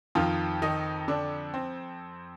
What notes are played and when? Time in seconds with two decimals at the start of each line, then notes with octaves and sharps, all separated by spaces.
0.15 F2 D#3 F3 F4
0.62 D#3 D#4
1.08 D3 D4
1.54 C4